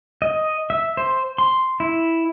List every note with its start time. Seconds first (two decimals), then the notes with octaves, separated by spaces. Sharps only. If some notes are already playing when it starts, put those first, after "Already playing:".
0.22 D#5
0.70 E5
0.97 C5
1.38 C6
1.80 E4